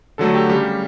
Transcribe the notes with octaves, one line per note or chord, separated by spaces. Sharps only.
D3 F#3 A3 A4
G4
C#3 G3 G4